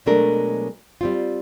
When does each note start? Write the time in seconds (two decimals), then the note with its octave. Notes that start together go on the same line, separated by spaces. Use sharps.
0.06 B2 F#3 G#3 A3 D4 A#4
1.01 G3 C4 F4